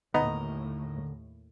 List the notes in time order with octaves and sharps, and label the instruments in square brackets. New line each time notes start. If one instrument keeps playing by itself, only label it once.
[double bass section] D#2 A2 [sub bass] D3 [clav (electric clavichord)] B3 D#4 [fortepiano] D#5 A#5